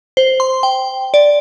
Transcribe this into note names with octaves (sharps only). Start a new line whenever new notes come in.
C5
C6
G5
D5